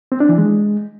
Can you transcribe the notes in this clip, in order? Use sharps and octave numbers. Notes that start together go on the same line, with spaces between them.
C4
D4
E3
G#3